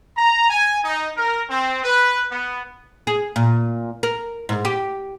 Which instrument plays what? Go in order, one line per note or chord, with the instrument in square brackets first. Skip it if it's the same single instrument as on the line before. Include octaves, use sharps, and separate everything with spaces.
[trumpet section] A#5
G#5
D#4
A#4
C4
B4
B3
[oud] G#4
A#2
A#4
G#2
G4